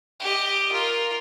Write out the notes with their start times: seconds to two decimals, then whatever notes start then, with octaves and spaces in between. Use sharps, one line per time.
0.20 G4 D#5
0.72 F4 A#4